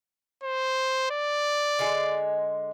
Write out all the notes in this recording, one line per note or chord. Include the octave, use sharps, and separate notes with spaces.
C5
D5
D3 G#3